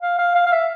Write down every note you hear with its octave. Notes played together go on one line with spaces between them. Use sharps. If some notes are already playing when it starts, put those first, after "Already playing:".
F5
F5
F5
F5
E5